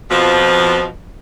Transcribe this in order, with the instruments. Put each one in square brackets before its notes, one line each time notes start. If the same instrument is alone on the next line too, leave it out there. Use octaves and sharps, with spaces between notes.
[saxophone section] F2 B2 F3